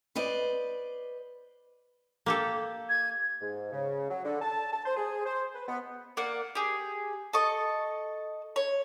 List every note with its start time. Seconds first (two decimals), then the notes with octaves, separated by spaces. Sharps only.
0.15 B4 C5 D5 D#5
2.26 A#3 G4 A4
2.89 G#6
3.41 G#2
3.72 C#3
4.10 F#3
4.25 D3
4.42 A5
4.73 A5
4.85 C5
4.97 G#4
5.25 C5
5.55 B4
5.68 B3
6.17 A#3 D5 F#5
6.55 G4 G#4
7.33 A4 D#5 C#6
8.56 C#5